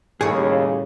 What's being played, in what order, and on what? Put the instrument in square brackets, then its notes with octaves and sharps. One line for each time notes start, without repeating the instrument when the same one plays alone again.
[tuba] D#2 [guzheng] A2 C#5 [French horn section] C#3 G3 [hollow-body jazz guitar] G#4